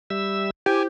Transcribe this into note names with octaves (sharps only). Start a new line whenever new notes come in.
G3 E5 E6
E4 G4 C5 G#5 G6